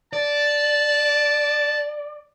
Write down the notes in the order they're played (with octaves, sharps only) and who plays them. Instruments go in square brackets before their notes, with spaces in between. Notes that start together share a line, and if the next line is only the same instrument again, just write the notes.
[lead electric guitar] D5 [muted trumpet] A5